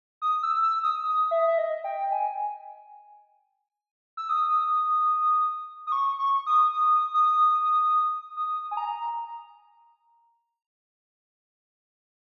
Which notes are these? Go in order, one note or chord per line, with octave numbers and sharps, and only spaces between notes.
D#6
E6
E6
D#6
D#6
E5
E5
D#5
G5
G#5
E6
D#6
D#6
C#6
C#6
D#6
D#6
D#6
D#6
G#5
A#5